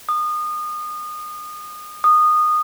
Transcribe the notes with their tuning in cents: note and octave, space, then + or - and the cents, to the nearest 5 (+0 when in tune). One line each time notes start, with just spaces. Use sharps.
D#6 -30
D#6 -20